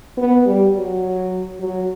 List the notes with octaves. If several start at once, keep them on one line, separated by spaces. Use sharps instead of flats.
B3
G3
F#3
F#3